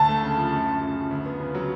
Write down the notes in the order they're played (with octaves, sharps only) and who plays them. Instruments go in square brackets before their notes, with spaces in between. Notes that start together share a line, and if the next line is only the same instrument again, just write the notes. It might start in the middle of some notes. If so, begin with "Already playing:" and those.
Already playing: [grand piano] D2 [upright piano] A5
[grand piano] A3
C#3
F3
F#2
F#2
C#3
F3
D2
B3
C#3
F#3